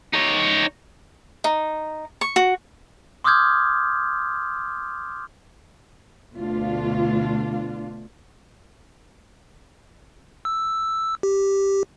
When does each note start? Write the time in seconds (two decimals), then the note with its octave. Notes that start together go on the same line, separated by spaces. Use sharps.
0.13 D#4 C#5
1.44 D#4
2.21 C#6
2.36 F#4
3.24 C6 D6 D#6 F6 G6 G#6
6.34 D2 B2 A3 D4 F4 F5
10.45 E6
11.23 G4